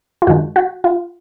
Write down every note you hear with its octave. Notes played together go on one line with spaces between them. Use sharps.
F4
F#2 D#3 G#3 F#4
F#4
F4